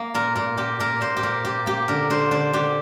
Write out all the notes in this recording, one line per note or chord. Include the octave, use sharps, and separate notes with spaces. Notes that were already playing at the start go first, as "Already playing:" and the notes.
Already playing: A#3
A#2 A#4
A#2 A#4
A#2 G4
A#2 A#4
A#2 C5
G4
A#2 A#4
A#2 G4
A#3 G4
D3 A#4
D3 C5
D3 C5
D3 G4